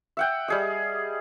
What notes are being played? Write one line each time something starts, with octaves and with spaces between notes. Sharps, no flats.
E5 F#5 G5
G3 G#4 D#5